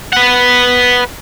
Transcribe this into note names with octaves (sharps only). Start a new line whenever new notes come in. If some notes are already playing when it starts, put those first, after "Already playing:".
B4 F#5